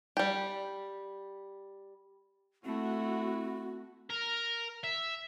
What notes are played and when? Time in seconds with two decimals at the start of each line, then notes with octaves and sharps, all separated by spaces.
0.17 G3 G4
2.65 A3 C4 E4 F#4
4.10 A#4
4.84 E5